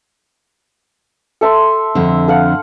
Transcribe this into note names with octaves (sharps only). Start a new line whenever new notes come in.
A4 E5 C6
F2 D3
A4 F5 F#5